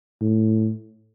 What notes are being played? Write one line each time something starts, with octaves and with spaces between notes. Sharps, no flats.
A2